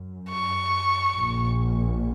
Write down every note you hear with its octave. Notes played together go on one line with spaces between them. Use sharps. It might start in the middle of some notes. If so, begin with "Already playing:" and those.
Already playing: F#2
C#6
A#1 A#2